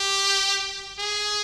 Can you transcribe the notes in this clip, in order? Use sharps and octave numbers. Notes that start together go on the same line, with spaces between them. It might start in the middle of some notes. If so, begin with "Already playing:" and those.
Already playing: G4
G#4